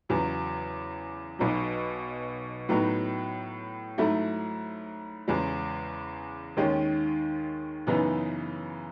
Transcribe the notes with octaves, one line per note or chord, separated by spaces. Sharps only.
E2 C#3 F#3
B1 B2 F#3
A2 F#3 B3 D#4 F#4
G#2 F#3 A3 E4
E2 C#3 G#3
D#2 D#3 G#3 C#4
F#2 C#3 E3 B3 D#4